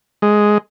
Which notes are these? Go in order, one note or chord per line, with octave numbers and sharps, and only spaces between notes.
G#3